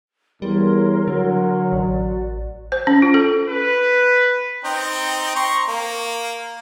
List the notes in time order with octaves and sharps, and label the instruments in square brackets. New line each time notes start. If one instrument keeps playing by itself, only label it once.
[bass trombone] E2 [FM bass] G3 [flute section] A#4 C#5 C6
[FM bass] D3 [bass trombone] F#3
[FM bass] A1 [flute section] F#4 D5
[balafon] C5
C#4
F4
A4
[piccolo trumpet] B4
[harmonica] C4 D#4 G5
A#5 C6 C#6
A#3